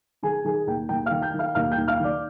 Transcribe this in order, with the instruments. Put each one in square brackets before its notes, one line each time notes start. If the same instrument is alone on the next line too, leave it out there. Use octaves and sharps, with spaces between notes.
[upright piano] D#3 G#4 G#5
D#3 G#4 G#5
D#2 G5
D#2 G5
D#3 F5 F6
G5 G6
D#3
F5 F6
D#2 F5 F6
G5 G6
D#2
F5 F6
D#3 D5 D6